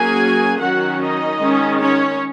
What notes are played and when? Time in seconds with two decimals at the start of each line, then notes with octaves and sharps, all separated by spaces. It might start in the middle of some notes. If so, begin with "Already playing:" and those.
Already playing: F#3 A#3 C#4 G#4 G#5
0.61 D#3 F#3 C#4 F#4 F#5
1.01 D#4 D#5
1.41 D#3 G#3 C#4
1.81 C#4 C#5